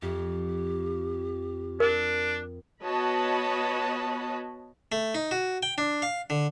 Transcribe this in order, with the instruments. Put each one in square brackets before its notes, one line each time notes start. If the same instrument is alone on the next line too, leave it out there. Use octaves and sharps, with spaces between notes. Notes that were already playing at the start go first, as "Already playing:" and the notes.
[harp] F2 [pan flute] G4
[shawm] D4 [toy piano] A#4
[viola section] B3 F#4 C#5 D#5 A5 B5
[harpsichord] A3
D#4
F#4
G5
D4
F5
D3